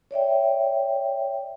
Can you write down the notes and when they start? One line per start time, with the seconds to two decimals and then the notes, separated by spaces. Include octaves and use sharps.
0.11 C#5 D5 E5 G5